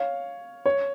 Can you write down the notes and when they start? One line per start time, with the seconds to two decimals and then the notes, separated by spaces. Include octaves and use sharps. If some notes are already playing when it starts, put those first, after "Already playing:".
Already playing: C#5 F5
0.66 C#5